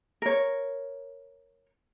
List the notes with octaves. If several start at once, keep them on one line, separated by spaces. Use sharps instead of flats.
A#4 C#5